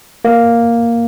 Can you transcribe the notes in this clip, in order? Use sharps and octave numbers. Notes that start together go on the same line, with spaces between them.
A#3